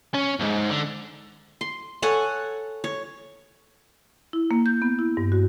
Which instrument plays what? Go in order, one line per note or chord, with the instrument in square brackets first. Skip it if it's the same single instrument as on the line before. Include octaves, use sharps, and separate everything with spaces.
[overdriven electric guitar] C#4
B1 G#2
D3
[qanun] C6
A4 C#5 F#5 G#5
C#5
[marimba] E4
A#3
G6
B3
E4
G2
F#4